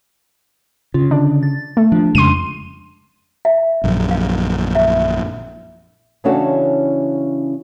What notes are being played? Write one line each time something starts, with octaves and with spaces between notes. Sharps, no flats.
C#3 F4
D3 D4
A6
A3
F3 D4
F2 C#3 G#3 C6 D#7
E5
A#1 F#2
F5
E5
C#3 E3 C#4 D4 F#4 A4